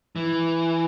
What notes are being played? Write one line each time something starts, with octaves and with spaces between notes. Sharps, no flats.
E3